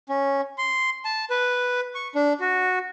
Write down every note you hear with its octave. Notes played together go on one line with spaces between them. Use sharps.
C#4
C6
A5
B4
C#6
D4
F#4